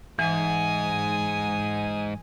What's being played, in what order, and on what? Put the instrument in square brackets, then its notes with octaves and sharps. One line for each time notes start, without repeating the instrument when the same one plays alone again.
[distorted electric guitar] G#2 [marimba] E3 [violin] G#5 D#6